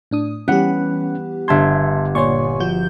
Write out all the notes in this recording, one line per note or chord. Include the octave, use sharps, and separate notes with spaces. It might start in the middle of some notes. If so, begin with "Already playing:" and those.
A2 D4 D#6
E3 G3 B3 C#4 G4 F#5
G1 E5 A5 C6 G#6
A#2 C#5 D5 G#5 C6 C#6
F3 F#4 G6